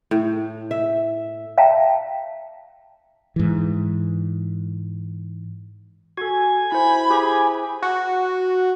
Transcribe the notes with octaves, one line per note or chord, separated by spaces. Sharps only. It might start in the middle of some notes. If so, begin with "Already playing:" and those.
A2
E5
E5 F5 G5 A5 A#5
G#2 E3
F#4 A4 G#5
E4 C5 B5
G4 G#4 B4
F#4